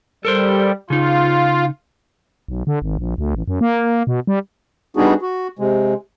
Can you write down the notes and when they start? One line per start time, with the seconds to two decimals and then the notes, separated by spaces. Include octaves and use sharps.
0.25 G3 A4 A#4 C5
0.90 C#3 D#4 F4
2.48 B1
2.67 D3
2.82 G#1
2.99 A#1
3.18 D2
3.35 A1
3.48 F#2
3.61 A#3
4.07 B2
4.27 G3
4.96 G3 B3 D4 D#4 F#4 G#4
5.22 F#4
5.59 C3 G#3